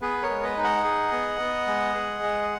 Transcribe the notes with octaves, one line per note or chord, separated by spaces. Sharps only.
B3 G#4 B4
A#4 C#5
G#3
B4 D#5
D#4
D#5 F#5
G#4
B3
B3
G#3
G#4
G#3